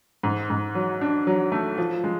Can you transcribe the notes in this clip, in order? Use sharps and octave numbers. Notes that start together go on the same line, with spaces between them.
G#2
G#2
F#3
D4
F#3
A3
F3
G#3